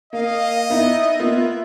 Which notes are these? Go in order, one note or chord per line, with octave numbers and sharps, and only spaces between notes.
A#3 D#5 F5
B3 D#4 E4 E5
A#3 B3 F4